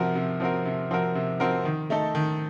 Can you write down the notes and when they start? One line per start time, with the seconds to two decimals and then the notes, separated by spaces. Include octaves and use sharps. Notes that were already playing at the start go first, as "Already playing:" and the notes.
Already playing: C3 F3 C4 F#4 A#4
0.15 C3
0.40 F3 C4 F#4 A#4
0.65 C3
0.91 F3 C4 F#4 A#4
1.15 C3
1.40 F3 C4 F#4 A#4
1.65 D#3
1.90 A3 D#4 A4
2.15 D#3